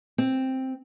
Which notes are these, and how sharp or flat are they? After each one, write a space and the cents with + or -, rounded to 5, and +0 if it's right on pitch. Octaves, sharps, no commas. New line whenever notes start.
C4 +5